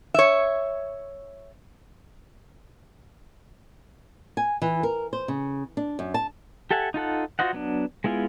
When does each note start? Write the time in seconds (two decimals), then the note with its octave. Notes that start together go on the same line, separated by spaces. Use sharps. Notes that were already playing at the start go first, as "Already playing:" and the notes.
0.14 C#5 E5
4.37 G#5
4.62 E3
4.83 A#4
5.13 C5
5.28 C#3
5.77 D4
5.99 F#2
6.14 A5
6.71 G4 A4 E5 F#5 G#5
6.94 D#4 F4 A4 F#5
7.39 F4 F#4 C5 D#5 F#5
7.53 F#3 B3 D4
8.04 G#3 B3 E4 F4 G#4